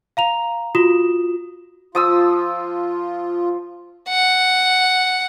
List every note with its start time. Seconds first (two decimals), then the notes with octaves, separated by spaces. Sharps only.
0.17 F5 A#5 F7
0.75 F4 F#4 D#6 E7
1.95 F3 F4 D#6 E6
4.08 F#5